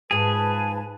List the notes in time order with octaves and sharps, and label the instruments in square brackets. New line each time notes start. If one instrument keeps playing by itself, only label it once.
[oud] G#2 F3 [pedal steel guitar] G#4 [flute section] B4 A5